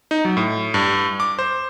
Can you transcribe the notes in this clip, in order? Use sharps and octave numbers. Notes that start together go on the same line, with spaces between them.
D#4
F#3
A2
G2
D6
C5